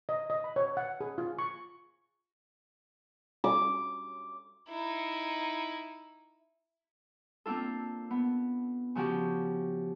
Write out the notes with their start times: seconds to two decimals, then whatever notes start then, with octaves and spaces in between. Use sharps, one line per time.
0.09 D#5
0.30 D#5
0.44 B5
0.56 C#5
0.77 F#5
1.01 G#4
1.18 F4
1.39 C#6
3.44 D6
4.69 D#4 E4
7.46 A#3 C4 D4 F4 A4
8.11 B3
8.95 C#3 F3 F#4 G4